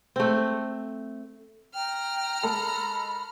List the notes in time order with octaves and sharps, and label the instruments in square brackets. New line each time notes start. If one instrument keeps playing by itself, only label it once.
[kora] A3 C4
[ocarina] G5 [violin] A#5 F6
[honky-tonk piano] G#3 A4 A#4 [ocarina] B5